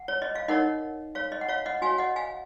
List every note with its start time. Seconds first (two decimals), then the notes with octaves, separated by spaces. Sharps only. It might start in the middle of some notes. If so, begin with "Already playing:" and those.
Already playing: F#5
0.08 C#5
0.22 D#5
0.35 F5
0.48 D#4 A#4 C#5 D#5 F#5
1.15 C#5 F5
1.32 D#5
1.41 F#5
1.48 C#5 F5
1.66 D#5 F#5
1.82 F#4 C#5 F5 G#5
1.98 D#5 F#5
2.16 F5 G#5